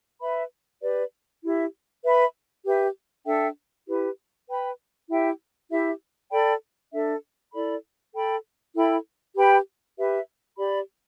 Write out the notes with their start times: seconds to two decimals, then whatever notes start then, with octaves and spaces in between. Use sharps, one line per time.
0.21 B4 E5 B5
0.82 G4 B4 D5
1.43 E4 G4 E5
2.03 B4 E5 B5
2.65 G4 B4 E5
3.26 D4 A4 E5 G5
3.87 E4 G4 B4
4.48 B4 G5 B5
5.09 E4 G4 E5 G5
5.70 E4 G4 E5
6.31 A4 D5 G5 B5
6.92 D4 A4 E5
7.53 E4 A4 D5 B5
8.14 A4 G5 B5
8.75 E4 A4 G5 B5
9.36 G4 B4 G5 B5
9.97 G4 B4 E5
10.58 G4 D5 B5